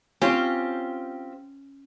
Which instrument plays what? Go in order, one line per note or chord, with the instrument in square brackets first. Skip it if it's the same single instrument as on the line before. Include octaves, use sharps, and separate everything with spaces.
[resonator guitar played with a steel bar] C4 F4 G4 [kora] C#4